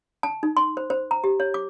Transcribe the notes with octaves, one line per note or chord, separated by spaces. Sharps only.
A5
D#4
C6
C5
C5
A#5
G4
C#5
D6